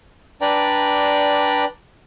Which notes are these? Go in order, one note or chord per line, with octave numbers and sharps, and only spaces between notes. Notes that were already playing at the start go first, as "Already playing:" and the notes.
D4 B4 D5 G5 A#5